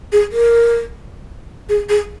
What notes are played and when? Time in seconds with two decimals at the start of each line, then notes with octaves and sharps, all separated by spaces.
0.12 G#4
0.32 A#4
1.69 G#4
1.89 G#4